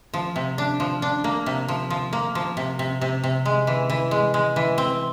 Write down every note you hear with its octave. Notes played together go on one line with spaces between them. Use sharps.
F3
C3
D4
F3
D4
A#3
C3
F3
F3
A#3
F3
C3
C3
C3
C3
G#3
E3
E3
G#3
G#3
E3
C4